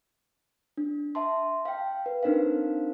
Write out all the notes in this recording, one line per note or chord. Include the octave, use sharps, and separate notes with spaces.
D4
E5 A5 C6
F5 G5
B4
C4 D4 D#4 A#4 C5 F5